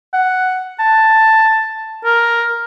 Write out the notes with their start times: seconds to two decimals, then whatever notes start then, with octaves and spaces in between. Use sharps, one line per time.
0.13 F#5
0.79 A5
2.05 A#4